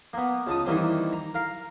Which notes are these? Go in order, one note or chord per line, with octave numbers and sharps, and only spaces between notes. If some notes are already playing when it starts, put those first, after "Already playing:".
A#3 B3
C#2 A5 D#6
D#3 E3 G3 A#3 C4
A#5
A#4 F5